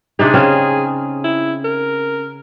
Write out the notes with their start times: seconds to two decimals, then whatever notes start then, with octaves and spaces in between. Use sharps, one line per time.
0.19 C3 D4 D#4 G#4
0.34 C#3 C4 C#4
1.24 E4
1.64 A#4